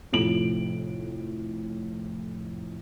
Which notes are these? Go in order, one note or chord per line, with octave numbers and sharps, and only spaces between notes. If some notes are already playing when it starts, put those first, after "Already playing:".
F1 F2 A2 D7 F#7